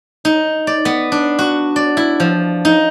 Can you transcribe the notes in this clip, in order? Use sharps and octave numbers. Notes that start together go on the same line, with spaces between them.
D#4
D5
B3
D4
F#4
D5
E4
F3
D#4